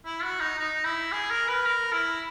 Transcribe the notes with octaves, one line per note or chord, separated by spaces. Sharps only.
E4
F#4
D#4
D#4
E4
G#4
A#4
B4
A#4
E4